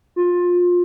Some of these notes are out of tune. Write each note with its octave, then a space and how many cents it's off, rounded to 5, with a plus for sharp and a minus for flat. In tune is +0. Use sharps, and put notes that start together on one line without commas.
F4 +20